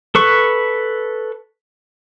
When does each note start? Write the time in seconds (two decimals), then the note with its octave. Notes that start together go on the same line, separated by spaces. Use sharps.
0.15 A4 B4 C#6